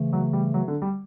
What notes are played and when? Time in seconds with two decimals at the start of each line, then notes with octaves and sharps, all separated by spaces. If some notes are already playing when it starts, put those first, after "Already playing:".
Already playing: C#3 E3 A3
0.13 F#3
0.33 G3
0.54 F#3
0.68 D3
0.82 G3